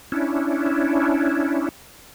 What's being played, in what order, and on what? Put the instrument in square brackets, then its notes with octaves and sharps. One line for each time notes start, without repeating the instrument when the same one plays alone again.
[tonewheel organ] C#4 D4 E4